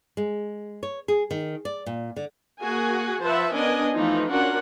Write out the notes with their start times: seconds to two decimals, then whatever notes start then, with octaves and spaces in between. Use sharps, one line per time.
0.17 G#3
0.83 C#5
1.08 G#4
1.31 D#3
1.65 D5
1.86 A#2
2.16 D3
2.62 A#3 F#4 G#4 G#5
3.22 F3 B4 C5 E5 F#5 A5
3.54 B3 C#4 D4 A#4 D#5 G#5
3.93 E3 F3 A3 D#4 F4
4.31 C#4 D4 F4 F#4 A#4 F#5